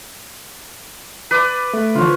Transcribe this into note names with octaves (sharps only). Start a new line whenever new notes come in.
B4 D5
A3
D3 E3 F3 F4 C#5